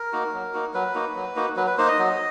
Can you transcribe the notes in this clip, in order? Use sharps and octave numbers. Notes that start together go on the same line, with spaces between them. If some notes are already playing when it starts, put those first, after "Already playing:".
Already playing: A#4
A#3 D#4 F#4
F#3
A#3 D#4 F#4
F#3 B4
A#3 D#4 F#4
F#3
A#3 D#4 F#4
F#3 B4
B4
A#3 D#4 C5
D#5
F#3